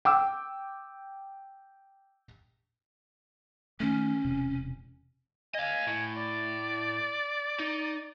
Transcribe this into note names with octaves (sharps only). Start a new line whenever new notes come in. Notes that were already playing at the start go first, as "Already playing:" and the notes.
G5 D6 E6
D#3 A3 C#4
E1 C3
D#5 F5 G#5
A2
D5
D#4